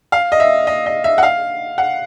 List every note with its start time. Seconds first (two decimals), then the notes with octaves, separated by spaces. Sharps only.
0.12 F5
0.32 D#5
0.40 E5
0.67 D#5
0.86 D#5
1.04 E5
1.18 F#5
1.23 F5
1.78 F#5